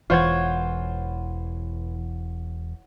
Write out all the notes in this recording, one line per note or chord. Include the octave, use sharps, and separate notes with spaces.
E1 E3 F4 C5 C#5 F#5 G#6